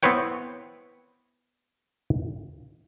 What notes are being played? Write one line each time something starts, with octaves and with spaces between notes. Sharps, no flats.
B3 C4 E4 B4 C#5 G5